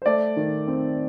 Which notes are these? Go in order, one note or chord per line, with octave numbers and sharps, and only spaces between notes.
C5
A3 D5
D#3
C4